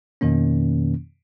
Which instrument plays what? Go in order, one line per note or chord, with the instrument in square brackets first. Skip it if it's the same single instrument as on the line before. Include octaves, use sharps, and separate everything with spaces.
[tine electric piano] F2 B2 D#3 A#3 C#4